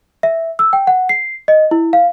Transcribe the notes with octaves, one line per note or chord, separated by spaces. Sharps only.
E5
E6
G5
F#5
C7
D#5
E4
F5